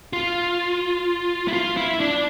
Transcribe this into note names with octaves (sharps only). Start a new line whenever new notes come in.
F4
E4
F4
E4
D4